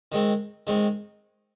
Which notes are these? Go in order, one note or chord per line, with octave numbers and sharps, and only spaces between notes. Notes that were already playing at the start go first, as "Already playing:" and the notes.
D#3 G#3 C4
D#3 G#3 C4